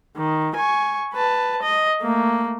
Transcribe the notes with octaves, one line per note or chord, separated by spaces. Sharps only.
D#3
G#5 C#6
B4 A5
D#5
A3 A#3